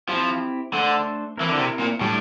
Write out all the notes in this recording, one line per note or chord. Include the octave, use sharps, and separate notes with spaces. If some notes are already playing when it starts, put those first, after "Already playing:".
F3 C4 E4 G4
D3 A3 D4 A4 C5
E3 C4 E4 A#4
D3
C3
A#2
A2 G3 D4 G4